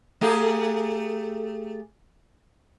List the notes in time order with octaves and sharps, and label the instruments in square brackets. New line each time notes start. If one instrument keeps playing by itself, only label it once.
[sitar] A3 G4 G#4